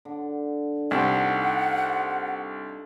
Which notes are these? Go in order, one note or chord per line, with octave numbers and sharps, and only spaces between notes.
D3
C2 D#4 F4 A4 F#5